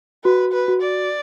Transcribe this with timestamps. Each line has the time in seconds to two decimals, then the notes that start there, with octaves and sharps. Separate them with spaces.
0.24 F#4 B4
0.53 B4
0.68 F#4
0.82 D5